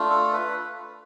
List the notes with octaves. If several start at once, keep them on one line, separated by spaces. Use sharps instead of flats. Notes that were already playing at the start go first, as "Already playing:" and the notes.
Already playing: A3 D4 F4
A4
B4